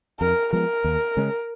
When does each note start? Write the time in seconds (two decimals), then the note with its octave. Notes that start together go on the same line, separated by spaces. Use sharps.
0.20 F2 A#4
0.53 F3 G#3 B3 A#4
0.84 D#2
1.17 C#3 G#3 C#4